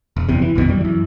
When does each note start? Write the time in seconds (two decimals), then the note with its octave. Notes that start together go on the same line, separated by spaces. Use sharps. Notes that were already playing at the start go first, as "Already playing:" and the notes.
0.17 E1
0.29 F#1 E2 C3
0.42 E3
0.55 A#1 F2 B2 D#3
0.68 F#2 G3
0.81 F#2 E3